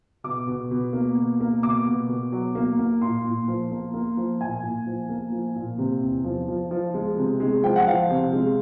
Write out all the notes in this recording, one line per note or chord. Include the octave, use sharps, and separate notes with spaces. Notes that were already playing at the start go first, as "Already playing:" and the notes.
B2 D6
B2
B2
A#3
B2
A#3
B2 D6
B2
B2
F#3
A#3
A#3
A#2 C6
A#2
F3
A#3
A#3
F3
A#2 G#5
A#2
F3
A#3
F3
A#2
C3
E2
F3
F3
F3
G#3
C3
G#3
F3 G5
F#5
F3 F5
C3
G#3